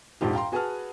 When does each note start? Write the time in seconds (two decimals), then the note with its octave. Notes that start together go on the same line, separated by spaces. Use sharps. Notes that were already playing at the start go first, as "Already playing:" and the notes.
0.21 A#1 F2 G#2 G4
0.33 F5 G5 A#5 C6
0.52 F#4 G#4 B4 F#5 A5 F6